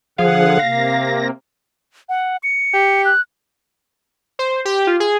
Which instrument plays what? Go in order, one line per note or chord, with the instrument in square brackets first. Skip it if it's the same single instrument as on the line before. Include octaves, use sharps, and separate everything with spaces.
[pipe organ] D3 F#5 [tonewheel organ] F3 G#4 [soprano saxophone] F5
[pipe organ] C3 A#3 [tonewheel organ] A#6
[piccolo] F#5
C#7
[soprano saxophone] G4
[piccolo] F#6
[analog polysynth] C5
G4
F4
G#4